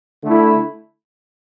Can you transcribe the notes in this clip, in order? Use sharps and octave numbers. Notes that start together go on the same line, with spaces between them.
D3 A3 E4